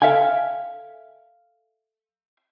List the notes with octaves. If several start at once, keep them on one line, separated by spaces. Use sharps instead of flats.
A4 E5 F5 G5 G#5